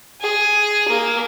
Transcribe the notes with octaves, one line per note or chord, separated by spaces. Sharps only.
G#4
A#3